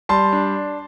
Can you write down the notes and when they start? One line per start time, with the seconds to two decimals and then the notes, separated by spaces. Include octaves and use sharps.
0.09 G3 A5 C6
0.33 D4